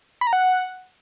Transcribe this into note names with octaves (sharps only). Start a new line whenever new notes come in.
B5
A#5
F#5